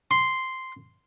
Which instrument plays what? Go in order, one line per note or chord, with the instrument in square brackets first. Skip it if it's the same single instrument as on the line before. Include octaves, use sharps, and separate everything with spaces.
[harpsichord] C6